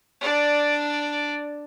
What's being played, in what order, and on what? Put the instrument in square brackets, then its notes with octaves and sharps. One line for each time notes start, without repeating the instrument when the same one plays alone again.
[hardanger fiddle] D4 D5